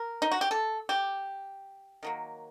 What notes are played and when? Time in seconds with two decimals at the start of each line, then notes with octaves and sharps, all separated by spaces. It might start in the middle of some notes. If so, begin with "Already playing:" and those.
Already playing: A#4
0.22 D#4
0.31 F#4
0.41 G4
0.51 A4
0.89 G4
2.03 D#3 F#3 A#3